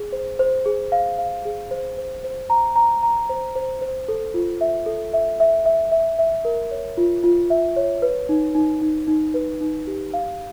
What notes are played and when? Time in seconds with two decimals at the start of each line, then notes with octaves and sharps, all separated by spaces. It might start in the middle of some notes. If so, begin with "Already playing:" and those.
Already playing: G#4
0.12 C5
0.39 C5
0.66 G#4
0.92 F5
1.19 F5
1.45 G#4
1.71 C5
1.98 C5
2.24 C5
2.50 A#5
2.76 A#5
3.03 A#5
3.29 C5
3.56 C5
3.81 C5
4.08 A4
4.34 F4
4.61 E5
4.86 A4
5.13 E5
5.40 E5
5.66 E5
5.92 E5
6.19 E5
6.45 A#4
6.71 C#5
6.97 F4
7.23 F4
7.50 E5
7.76 C#5
8.02 B4
8.29 D#4
8.55 D#4
8.82 D#4
9.08 D#4
9.34 B4
9.61 D#4
9.87 G4
10.14 F5